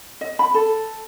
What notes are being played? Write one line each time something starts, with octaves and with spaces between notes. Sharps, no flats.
D#5
B5
A4